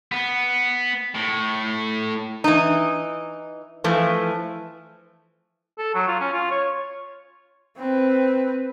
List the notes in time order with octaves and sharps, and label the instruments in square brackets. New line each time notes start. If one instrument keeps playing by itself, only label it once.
[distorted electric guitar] B3
A2
[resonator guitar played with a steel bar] E3 D#4
E3 F3 A3
[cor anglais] A4
F#3
F4
C#4
F4
C#5
[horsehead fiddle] C4 B4